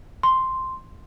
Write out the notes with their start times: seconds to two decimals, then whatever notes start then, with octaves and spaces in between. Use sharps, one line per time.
0.23 C6